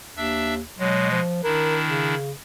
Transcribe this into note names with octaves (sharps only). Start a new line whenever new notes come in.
D#2 D4 E5 E6
B2 F#3 G#3
F3
D#3 D4 E4 A#4
C#3